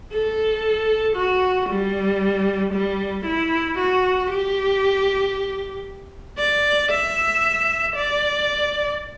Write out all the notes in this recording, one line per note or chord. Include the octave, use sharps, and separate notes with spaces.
A4
F#4
G3
G3
E4
F#4
G4
D5
E5
D5